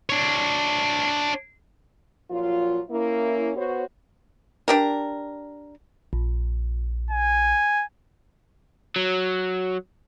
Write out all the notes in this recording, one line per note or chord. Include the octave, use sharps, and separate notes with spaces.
D4 C#5
A#2 F3 F#3 F4
A#3 C#4 E4
B3 F#4 C5 C#5
D4 G4 A#4
A#1
G#5
F#3